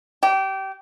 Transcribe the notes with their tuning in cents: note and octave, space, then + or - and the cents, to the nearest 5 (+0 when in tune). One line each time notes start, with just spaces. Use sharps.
G4 -25